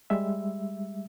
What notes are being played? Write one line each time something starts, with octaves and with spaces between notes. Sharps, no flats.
G3 G#3 E5